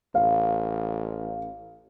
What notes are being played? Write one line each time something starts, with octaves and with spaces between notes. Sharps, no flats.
A1 F5